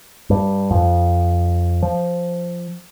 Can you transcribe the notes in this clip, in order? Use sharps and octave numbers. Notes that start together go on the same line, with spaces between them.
G2
F2
F3